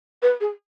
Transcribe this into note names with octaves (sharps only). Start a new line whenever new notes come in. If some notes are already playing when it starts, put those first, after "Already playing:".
B4
G#4